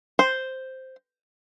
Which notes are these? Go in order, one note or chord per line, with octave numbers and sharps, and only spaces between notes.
C5